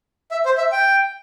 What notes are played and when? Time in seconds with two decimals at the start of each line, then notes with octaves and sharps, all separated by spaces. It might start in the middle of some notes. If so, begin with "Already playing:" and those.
0.31 E5
0.45 C5
0.58 E5
0.72 G5